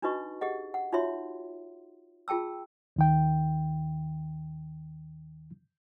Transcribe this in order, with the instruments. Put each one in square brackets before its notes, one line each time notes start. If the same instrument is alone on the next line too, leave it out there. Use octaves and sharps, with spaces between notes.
[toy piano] D4 D#4 F#4 B4 D#5 C#6
G4 G#4 D#5 F#5
F#5
D#4 F4 F#4 C#5 E5 C6
F4 G#4 G5 A5 E6
[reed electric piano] D#2 D#3 G5